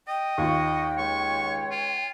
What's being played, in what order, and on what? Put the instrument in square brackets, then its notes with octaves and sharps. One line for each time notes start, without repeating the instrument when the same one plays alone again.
[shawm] D#5 [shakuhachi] G5
[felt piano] D#2 F4 [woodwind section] C#6
[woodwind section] C#2 G#3 C#5 [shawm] C#6
[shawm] F4